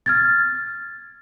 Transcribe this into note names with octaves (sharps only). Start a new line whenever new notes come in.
F6 G#6 A6